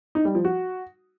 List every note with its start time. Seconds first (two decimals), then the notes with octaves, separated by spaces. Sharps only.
0.15 D#4
0.25 G3
0.35 F3
0.45 F#4